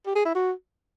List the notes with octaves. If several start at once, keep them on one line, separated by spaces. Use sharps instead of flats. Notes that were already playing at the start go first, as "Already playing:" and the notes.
G4
G#4
E4
F#4